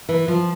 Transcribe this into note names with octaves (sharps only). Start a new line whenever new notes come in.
E3
F3